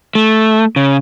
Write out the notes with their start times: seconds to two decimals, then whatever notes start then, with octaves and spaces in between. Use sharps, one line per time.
0.15 A3
0.76 C#3